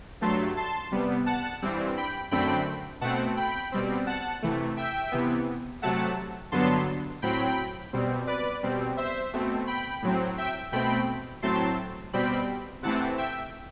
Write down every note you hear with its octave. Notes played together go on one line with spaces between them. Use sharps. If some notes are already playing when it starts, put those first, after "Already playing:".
G2 F#3 A3 A5 C6
A5 C6
C3 G3 B3
F#5 A5
G2 E3 G3 C4
G5 B5
F#2 D3 A3 C4 G5 B5
B2 A3 C4 F#5 A5
G5 B5
B2 G3 C4
F#5 A5
C3 E3 A3
E5 G5
C3 E3 B3
C3 F#3 A3 F#5 A5
G2 D3 F#3 B3 A5 C6
A2 F#3 C4 G5 B5
B2 G3 C4
B4 D5
B2 G3 C4
C5 E5
B2 A3 C4
G5 B5
A2 F#3 C4
E5 G5
B2 A3 C4 G5 B5
A2 F#3 A3 C4 A5 C6
B2 G3 C4 G5 B5
C3 E3 A3 C4 F#5 A5
E5 G5